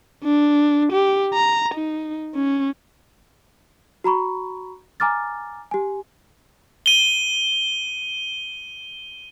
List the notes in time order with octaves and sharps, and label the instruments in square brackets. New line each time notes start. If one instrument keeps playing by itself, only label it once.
[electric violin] D4
G4
A#5
D#4
C#4
[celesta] F#4 A#5 B5 C#6
G#5 A#5 D6 F6 A6
G4 G#5
[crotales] D#7 G7